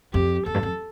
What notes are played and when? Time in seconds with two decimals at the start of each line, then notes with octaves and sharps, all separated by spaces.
0.14 F2 G4
0.46 E2 A4
0.54 G2
0.63 F2